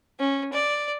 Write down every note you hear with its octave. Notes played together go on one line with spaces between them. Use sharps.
C#4
D5